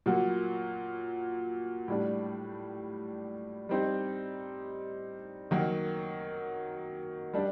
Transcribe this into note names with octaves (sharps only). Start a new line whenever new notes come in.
A#2 F#3 A#3 F#4
A2 G3 D4 G4
G3 C4 D#4 G4
D#3 F#3 A#3 F#4
G3 D4 G4